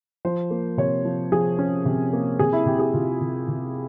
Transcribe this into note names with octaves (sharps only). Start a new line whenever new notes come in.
F3 C5
A#3
C3 C#5
F3
F3 G#4
C#4
C3
A#3
C3 G#4
E4
C3 G4
G#4
C3 F4
C3
C3